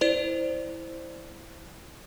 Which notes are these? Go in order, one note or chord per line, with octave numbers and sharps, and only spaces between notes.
E4 C5 D5 F7